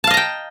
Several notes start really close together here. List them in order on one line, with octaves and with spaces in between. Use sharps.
A5 F5 D#5 A#5 G5